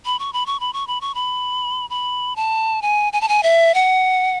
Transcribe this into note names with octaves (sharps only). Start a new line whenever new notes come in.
B5
C#6
B5
C#6
B5
C#6
B5
C#6
B5
B5
A5
G#5
G#5
A5
G#5
E5
F#5